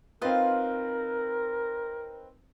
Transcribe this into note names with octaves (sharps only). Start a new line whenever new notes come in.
C4 D#4 F4 A#4 B4 D#5 F5